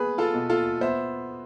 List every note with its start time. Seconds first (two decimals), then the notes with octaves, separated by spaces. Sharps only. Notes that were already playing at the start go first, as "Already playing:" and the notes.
Already playing: B3 G#4 B4
0.18 F4 A4
0.34 B2
0.50 F4 A4
0.81 B3 C5 E5